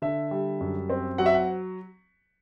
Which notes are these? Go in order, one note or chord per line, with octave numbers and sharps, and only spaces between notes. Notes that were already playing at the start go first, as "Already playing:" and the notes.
D3 E5
G3
F#2
C4
F#3 F#5
E5
F#5